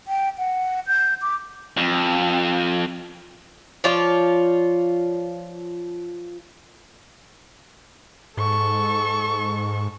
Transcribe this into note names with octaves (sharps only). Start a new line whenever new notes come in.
G5
F#5
G6
D6
F2
F3 F4 C#5 D5
G#2 A4 C#6